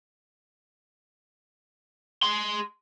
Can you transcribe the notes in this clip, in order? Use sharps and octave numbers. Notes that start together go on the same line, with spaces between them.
G#4 C6